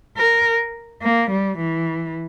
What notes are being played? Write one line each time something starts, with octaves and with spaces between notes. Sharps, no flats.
A#4
A#3
G3
E3